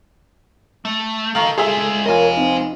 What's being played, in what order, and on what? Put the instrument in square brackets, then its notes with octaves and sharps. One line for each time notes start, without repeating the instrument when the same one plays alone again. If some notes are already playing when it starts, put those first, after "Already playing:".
[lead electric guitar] A3
[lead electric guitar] D#3 [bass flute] A4 [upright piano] F5 A#5 C#6
[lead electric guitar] G#3 F4 [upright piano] G#4 E5
[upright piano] F1 F4 [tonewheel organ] A#4 [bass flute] C#5 [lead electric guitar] D#5 G#5
[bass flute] C4 [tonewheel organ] D#4